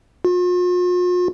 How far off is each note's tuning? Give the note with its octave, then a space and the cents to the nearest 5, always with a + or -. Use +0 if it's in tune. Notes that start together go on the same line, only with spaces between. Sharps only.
F4 +45